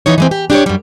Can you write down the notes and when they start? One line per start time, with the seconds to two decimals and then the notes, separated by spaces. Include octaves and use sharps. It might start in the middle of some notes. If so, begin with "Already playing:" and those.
0.06 E3 B3 D#4 C#5
0.18 E3 G#3 C4
0.31 G4
0.50 D4 G4 A4 C#5
0.66 F#2 G3